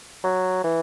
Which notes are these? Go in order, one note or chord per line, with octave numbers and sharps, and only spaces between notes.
F#3
E3